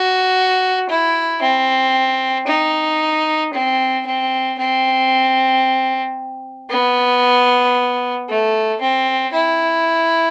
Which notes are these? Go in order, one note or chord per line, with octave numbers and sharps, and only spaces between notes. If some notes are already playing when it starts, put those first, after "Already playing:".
Already playing: F#4
E4
C4
D#4
C4
C4
C4
B3
A3
C4
E4